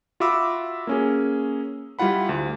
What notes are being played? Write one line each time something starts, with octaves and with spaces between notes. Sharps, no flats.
F4 F#4 E5 B5 D6 E6
A#3 C#4 G#4
G3 E4 F4 F#5 B5
D2